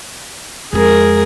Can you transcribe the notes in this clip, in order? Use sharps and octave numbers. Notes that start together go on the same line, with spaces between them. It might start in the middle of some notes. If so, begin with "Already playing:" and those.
F2 G#3 G#4 A#4